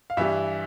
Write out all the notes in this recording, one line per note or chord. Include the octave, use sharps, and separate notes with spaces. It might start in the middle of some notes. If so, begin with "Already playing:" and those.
F5
G2 E3 G3 E5